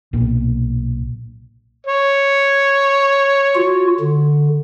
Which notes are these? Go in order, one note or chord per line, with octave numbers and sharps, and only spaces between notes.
B1 A#2
C#5
F4 F#4
D3